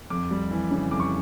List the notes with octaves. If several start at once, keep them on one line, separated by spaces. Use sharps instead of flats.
F2 D6
G3
E3
C#3
F2 D6
C#6